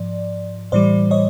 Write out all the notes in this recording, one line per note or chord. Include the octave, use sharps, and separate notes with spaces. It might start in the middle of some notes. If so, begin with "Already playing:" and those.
Already playing: G#2 F3 D5
A2 E3 G3 C5 D5
C#5 D#5